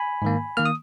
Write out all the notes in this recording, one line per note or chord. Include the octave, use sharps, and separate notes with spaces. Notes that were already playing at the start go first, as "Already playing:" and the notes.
Already playing: G#5 B5
G#2 D#3 A#3
D#3 A#3 F6
D#6